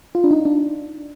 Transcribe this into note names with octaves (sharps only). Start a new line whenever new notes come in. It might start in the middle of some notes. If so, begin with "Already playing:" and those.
F4
D4
D#4
D4